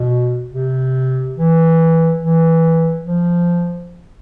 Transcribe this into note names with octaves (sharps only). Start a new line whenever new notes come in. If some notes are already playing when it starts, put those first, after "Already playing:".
Already playing: B2
C3
E3
E3
F3